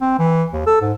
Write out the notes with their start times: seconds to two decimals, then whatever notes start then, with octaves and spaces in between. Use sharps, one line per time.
0.01 C4
0.19 E3
0.53 D#2
0.66 A4
0.81 G#2